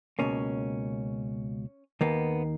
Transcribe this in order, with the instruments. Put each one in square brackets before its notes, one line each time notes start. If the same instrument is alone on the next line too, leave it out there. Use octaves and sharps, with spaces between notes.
[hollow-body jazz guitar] C#2 B2 A#3 C#4
D#2 D#3 A#3 B3